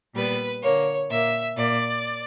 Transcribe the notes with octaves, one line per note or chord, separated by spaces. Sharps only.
A#2 G3 B3 B4
D3 A#3 C#5
A#2 A#3 E5
A#2 A#3 D5